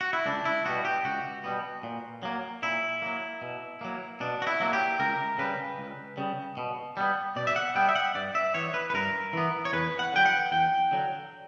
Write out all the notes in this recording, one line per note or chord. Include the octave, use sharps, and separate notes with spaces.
F#4
E4
C#2 D4
E4
B2 G3 B3 F#4
G4
C#2 F#4
B2 G3 B3
A#2
F#3 A#3
A#2 E4
F#3 A#3
B2
F#3 A#3
B2 D4
F#4
E4
F#3 A#3
G4
C#2 A#4
C#3 G3 B4
C#2
C#3 G3
B2
G3 B3
B2 D5
E5
F#5
G3 B3 G5
E5
F#5
G2 D5
E5
E3 B3 C#5
B4
B4
G2 A#4
E3 B3
C#5
E2 B4
F#5
D3 F#3 G5
F#5
E2 G5
D3 F#3